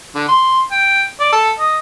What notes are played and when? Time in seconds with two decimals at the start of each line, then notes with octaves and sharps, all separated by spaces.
0.15 D3
0.28 C6
0.72 G5
1.20 D5
1.32 A4
1.59 D#5